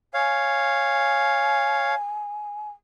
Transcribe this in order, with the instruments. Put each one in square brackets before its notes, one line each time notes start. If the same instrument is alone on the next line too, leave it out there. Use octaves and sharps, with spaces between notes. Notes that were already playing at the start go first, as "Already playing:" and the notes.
[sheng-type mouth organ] C#5 F5 [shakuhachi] G#5